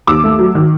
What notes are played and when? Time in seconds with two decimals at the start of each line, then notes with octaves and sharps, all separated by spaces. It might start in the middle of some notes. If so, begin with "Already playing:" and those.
0.07 D#2 D6 E6
0.24 A3
0.39 F#3
0.55 D#3